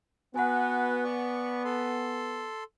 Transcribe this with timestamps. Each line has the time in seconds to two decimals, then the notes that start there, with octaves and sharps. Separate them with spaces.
0.36 B3 F#4 B4 F#5 G#5
1.04 D5 C#6
1.65 A4 C6